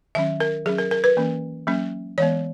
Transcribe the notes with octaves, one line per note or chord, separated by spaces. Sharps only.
D#3 F#3 C#4 E5
A#4
F#3 C#4 G#4
A#4
A#4
B4
E3 A#3 C#4
F#3 A#3 C#4
E3 G#3 B3 C#5